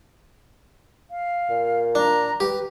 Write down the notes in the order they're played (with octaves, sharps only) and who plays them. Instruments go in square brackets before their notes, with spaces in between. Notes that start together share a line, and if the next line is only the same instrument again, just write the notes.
[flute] F5
[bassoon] A#2
[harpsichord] D4 [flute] A#5
[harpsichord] G4 [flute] B4